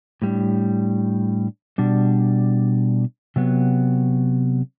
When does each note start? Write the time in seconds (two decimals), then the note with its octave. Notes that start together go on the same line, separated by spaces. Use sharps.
0.22 A2 G3 D4
1.78 B2 G3 D4
3.36 C3 F#3 B3